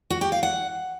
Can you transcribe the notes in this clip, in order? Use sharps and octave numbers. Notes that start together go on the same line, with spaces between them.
F#4
G4
F5
F#5